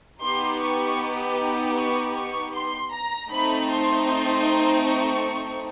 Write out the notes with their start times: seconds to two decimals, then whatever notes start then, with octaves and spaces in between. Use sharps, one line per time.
0.22 B3 D#4 G4 C6
0.60 C#6
1.76 C#6
2.14 C#6
2.53 C6
2.92 A#5
3.30 A3 C4 D#4 B5
3.69 C6
4.07 C6
4.85 C#6